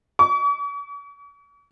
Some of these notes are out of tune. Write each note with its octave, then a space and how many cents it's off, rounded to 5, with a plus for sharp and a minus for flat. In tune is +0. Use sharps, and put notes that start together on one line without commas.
C#6 +45